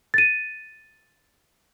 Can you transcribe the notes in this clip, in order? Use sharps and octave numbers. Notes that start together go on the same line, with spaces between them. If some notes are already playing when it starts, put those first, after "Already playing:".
A6 D#7